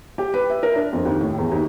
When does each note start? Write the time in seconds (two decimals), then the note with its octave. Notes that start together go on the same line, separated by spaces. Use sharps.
0.18 G4
0.34 B4
0.50 E5
0.63 A#4
0.75 D4
0.93 F2
1.05 D#2
1.21 A2
1.38 E2
1.52 D#2